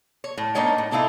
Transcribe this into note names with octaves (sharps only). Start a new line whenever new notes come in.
C#5
A2
A#3 B3 D4 D#4 C#5 G5
A2
C3 A3 D#4 E4 F5